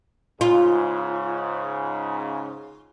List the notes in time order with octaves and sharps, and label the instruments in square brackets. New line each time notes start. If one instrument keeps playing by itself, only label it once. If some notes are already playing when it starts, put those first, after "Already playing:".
[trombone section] G#2 C#3 [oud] F4